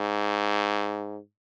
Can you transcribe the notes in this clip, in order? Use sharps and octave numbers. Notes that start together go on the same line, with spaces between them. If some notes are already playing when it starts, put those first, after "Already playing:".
Already playing: G#2